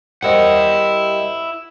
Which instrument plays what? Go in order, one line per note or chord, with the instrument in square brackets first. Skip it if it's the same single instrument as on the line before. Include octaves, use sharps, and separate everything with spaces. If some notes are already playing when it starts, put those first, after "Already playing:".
[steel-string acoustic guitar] G3 A#4 C5 [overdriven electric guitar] E4 F#5 [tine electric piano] D#5 C#7